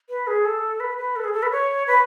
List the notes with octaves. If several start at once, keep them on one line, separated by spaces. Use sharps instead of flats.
B4
G#4
A4
B4
B4
A4
G#4
A4
B4
C#5
B4